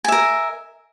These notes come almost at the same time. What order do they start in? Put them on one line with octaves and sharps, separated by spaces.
G#5 E5 A#4